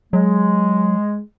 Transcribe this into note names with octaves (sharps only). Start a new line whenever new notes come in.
F#3 G#3